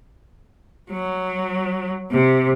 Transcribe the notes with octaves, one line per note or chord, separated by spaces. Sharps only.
F#3
C3